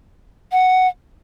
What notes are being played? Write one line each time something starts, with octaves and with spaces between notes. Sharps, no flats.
F#5